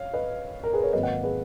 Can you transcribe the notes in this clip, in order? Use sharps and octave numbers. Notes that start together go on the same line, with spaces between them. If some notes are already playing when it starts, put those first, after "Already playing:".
Already playing: C#5 F5
B4 D#5
A#4
G#4 B4
A#4 C#5
G#1 G#2 F#3 A#3 B4 D#5
D#5 F#5
G#4 B4